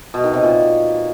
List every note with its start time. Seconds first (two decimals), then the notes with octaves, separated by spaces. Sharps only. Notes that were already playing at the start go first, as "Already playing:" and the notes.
0.14 B2
0.24 D#3
0.34 C3
0.43 A#2